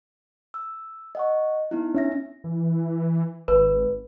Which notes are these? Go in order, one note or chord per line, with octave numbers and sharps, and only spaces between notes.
E6
D#5 F#5 C#6
B3 D#4 E4
C#4 D4 E5 A#6
E3
G#1 B4